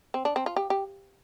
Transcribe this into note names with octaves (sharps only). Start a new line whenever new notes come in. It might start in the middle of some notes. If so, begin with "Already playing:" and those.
C4
D4
C4
F4
G4
G4